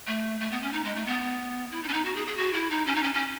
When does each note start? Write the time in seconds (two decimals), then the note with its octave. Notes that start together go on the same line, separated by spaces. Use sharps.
0.07 A3
0.40 A3
0.51 B3
0.62 C#4
0.73 D#4
0.84 G#3
0.95 A3
1.06 B3
1.71 E4
1.83 D#4
1.88 C#4
1.93 D#4
2.05 F#4
2.16 G#4
2.27 G#4
2.37 F#4
2.53 E4
2.70 D#4
2.86 C#4
2.95 D#4
3.03 C#4
3.14 C#4